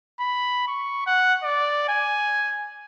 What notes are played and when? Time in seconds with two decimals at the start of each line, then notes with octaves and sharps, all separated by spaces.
0.20 B5
0.67 C#6
1.06 F#5
1.43 D5
1.88 G#5